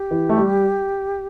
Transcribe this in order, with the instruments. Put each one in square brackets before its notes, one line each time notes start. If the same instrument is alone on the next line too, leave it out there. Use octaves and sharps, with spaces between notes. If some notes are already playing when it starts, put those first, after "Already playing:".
Already playing: [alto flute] G4
[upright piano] E3
A3
G3